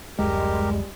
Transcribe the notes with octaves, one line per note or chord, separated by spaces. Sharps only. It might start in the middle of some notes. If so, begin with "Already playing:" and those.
D1 F#2 G3 G#3 G4 A#4